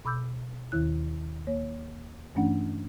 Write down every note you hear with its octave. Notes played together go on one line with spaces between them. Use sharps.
B2 B5 D6 E6 G6
D#2 D#3 E4 F#6
A#3 C#5
G2 E3 A3 C#4 D4 F#5